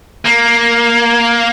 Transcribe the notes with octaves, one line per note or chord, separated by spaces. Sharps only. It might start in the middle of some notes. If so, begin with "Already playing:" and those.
A#3